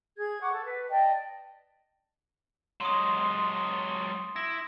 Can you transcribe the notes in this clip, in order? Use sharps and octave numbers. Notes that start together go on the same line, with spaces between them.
G#4 G#6
F#5 C#6 D6
A4
B4
D5 D#5 G5 A5
F#3 G#3 C6 D#6
E4 A#6